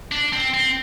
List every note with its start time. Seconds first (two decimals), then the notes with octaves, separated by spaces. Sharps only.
0.12 D4
0.33 C4
0.54 C4